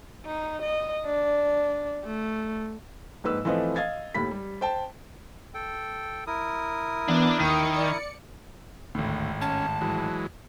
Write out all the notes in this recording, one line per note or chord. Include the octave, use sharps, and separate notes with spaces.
D#4
D#5
D4
A3
A#1 G#2 B4 E6
E3 F3 A3 C4 B4 D#5
D#5 F5 G#6 A6
D#2 A2 B5 B6
G3
C5 G5 A5
A4 G5
E4 A#4 D#6
E3 B3 D4
D#2 D#3 C#7
D5 C#7
G#1 D2 A2
C#4 A5
E3 F#3 G#3